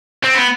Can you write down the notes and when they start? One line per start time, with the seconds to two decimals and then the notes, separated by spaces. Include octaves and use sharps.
0.24 C4
0.35 B3